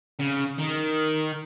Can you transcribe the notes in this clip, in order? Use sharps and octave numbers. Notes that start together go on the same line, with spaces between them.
C#3
D#3